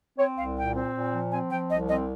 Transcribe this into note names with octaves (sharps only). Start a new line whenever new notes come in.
C4 C#5
C2 F5
A#2 G5
C4
A#2
F3
C4 G#5
F3 G5
C2 D#5
C4 D#5